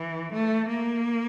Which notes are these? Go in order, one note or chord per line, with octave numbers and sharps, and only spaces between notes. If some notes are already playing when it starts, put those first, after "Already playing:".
Already playing: E3
A3
A#3